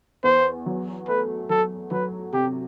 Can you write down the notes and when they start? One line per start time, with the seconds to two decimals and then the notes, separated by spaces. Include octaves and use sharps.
0.24 E2 C5
0.66 F#3
1.08 A3 B4
1.50 F#3 A4
1.91 F#3 B4
2.33 C3 G4